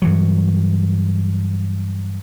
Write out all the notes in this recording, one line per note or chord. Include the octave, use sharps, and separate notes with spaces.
G2 E3 F#3